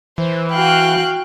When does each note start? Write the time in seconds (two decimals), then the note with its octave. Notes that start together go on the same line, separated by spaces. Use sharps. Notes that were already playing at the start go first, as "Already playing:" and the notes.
0.18 E3 C5
0.51 F#4 F5 G5 F#6